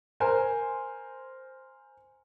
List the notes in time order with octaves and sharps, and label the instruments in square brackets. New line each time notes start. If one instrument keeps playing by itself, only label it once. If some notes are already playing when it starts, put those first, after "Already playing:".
[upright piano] A#4 C5 G#5